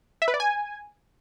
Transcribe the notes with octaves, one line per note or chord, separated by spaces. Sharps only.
E5
B4
D5
G#5